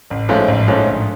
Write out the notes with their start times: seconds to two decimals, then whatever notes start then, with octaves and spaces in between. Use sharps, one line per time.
0.10 A1
0.29 G#2 F3 A3 C#4
0.48 A1
0.67 G#2 F3 A3 C#4
0.87 A#1